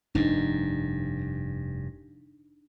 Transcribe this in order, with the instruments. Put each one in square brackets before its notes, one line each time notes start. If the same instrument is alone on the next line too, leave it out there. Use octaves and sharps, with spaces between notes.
[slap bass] F1 G2 [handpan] D4 D#4